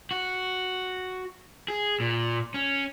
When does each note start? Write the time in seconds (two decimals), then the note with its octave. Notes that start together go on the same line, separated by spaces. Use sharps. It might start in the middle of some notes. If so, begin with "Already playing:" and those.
0.11 F#4
1.68 G#4
2.00 A#2
2.54 C#4